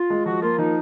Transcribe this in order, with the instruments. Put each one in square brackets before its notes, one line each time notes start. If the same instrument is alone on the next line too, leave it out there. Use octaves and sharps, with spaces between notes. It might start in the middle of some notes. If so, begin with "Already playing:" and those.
Already playing: [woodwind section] F4
[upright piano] G#3
[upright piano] F3 [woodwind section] F#4
[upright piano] A#3 [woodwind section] F4
[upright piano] F3 [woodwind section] D#4